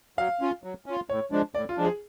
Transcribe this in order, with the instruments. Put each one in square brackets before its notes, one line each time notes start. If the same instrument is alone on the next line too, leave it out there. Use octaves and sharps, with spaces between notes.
[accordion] F#3 [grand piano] F5
[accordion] C#4 F4
F#3
C#4 F4
[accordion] A2 [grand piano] C#5
[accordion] F3 G#3 D4
[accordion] A2 [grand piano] D5
[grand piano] F4
[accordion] F3 G#3 D4
[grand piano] G#4